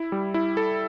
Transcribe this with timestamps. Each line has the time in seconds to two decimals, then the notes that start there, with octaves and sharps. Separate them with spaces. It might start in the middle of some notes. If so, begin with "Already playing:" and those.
Already playing: E4
0.12 G3
0.34 E4
0.57 A4